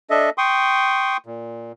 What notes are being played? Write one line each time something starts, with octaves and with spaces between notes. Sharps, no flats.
D4 A4 D#5 E5
G5 C6 C#6 D#6
A#2